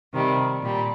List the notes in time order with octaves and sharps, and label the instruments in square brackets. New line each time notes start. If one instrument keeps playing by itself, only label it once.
[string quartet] C3 D#3 G3
A#2 G3